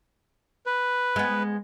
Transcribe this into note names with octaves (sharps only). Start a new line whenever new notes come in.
B4
G#3 B3